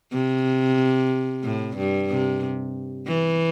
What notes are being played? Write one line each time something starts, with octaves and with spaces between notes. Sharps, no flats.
C3
A2
G2
C3
E3